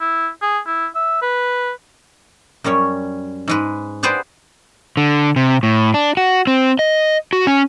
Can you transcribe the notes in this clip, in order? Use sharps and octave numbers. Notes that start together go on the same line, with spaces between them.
E4
G#4
E4
E5
B4
F#2 G3 C#4 C#5
G#2 G#3 B4
G4 G#4 B4 C5 D5 F#5
D3
C3
A2
D4
F#4
C4
D#5
F#4
C#4